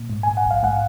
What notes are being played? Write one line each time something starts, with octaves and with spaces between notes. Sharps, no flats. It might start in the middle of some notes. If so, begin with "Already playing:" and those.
Already playing: A#2
G#2
G#2 G#5
F#5
A#1
F5
G#2 F#5